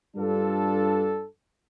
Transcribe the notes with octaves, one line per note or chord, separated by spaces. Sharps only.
G2 G3 D4 F4 A4